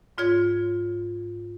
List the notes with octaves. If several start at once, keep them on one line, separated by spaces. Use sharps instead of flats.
G#2 F4 C#5 G#6